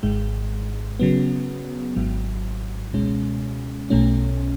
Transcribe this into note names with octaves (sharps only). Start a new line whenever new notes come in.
G#1 G#2 G#3
C#3 F#3 B3
G#1 G#2 F#3
C#2 B2 G#3 C#4
B1 B2 A3 C#4